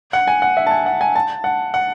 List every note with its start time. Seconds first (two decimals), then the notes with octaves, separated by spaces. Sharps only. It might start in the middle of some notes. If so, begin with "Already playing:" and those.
0.13 F#5
0.28 G#5
0.42 F#5
0.57 E5
0.67 A5
0.71 G#5
0.86 F#5
1.01 G#5
1.16 A5
1.44 F#5
1.74 F#5